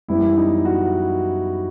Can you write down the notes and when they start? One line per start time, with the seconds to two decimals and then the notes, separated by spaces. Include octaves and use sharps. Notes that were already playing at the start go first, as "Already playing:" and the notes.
0.08 F#2 E3 G3 B3 E4
0.37 D#4
0.65 F#4